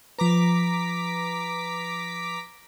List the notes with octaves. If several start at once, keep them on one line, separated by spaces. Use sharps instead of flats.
F3 B4 A#5 D6 B6